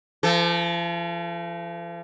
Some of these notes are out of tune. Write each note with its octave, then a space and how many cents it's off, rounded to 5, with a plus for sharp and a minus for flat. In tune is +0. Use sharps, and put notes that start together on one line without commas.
F3 -40 A4 +0